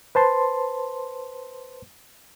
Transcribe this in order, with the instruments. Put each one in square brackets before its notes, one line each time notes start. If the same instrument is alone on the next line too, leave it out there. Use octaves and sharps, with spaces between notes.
[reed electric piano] B4 C5 A5 C6